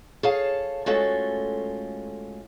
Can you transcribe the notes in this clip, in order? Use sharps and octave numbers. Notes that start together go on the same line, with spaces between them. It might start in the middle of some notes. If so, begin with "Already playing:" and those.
G#4 A4 C#5 F5 A5
G#3 A3 C#4 F4 F#4 A4